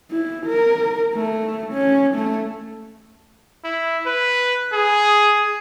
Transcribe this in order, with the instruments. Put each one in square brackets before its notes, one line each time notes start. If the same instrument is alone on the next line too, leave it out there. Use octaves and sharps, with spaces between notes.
[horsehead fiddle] E4
A#4
A3
C#4
A3
[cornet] E4
B4
G#4